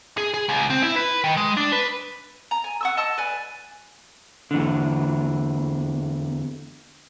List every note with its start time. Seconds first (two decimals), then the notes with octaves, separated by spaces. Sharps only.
0.18 G#4
0.34 G#4
0.49 C#2
0.70 C4
0.83 E4
0.96 B4
1.24 D#3
1.37 G#3
1.57 D4
1.72 B4
2.51 A#5
2.64 G#5
2.81 F#5 C#6 E6
2.97 D#5 A5 C#6 E6
3.18 B4 D5 G#5
4.51 E2 D3